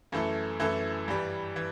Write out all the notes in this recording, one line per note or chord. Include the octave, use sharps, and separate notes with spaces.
F#2 E3 A3 E4 A4
F#2 E3 A3 E4 A4
G2 E3 G3
E3